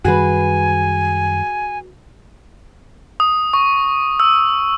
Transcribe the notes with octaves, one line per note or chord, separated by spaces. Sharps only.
F#2 D#3 G3 F#4 G#4 B4 G#5
D#6
C#6
E6